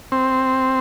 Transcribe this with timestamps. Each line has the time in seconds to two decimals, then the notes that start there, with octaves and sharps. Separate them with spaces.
0.12 C4